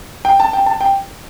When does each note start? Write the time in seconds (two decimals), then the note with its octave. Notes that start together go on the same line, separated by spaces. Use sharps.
0.25 G5
0.40 A5
0.53 G5
0.66 A5
0.81 G5